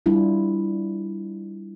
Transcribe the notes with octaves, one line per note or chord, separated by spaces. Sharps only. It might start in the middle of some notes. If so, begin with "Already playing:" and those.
G3 D4 E4 F4